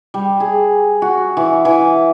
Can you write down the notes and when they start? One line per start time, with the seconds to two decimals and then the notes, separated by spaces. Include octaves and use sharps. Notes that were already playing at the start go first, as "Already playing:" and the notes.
0.14 G3
0.40 G#4
1.02 F#4
1.37 E3
1.65 E3